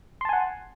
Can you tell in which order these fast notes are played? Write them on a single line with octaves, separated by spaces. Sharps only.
C6 A5 G#5 F#5